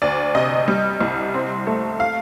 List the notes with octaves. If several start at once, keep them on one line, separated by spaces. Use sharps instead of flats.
D2 D5
C3 D#5
G3
C2
C4
A3
F5